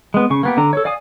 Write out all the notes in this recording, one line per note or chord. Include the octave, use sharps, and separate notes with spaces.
G#3 B3
C#3 C#6
A#3 B3 G4
D3 D4 A#5
A4 C#5
D5 F5 G#5 D#6